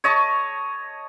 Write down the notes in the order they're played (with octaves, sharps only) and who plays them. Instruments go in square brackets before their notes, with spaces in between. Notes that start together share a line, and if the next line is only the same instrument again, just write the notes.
[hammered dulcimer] C#5 D#5 A5 C#6